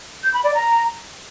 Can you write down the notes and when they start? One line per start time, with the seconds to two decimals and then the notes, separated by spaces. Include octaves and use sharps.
0.23 G6
0.34 B5
0.44 D5
0.54 A#5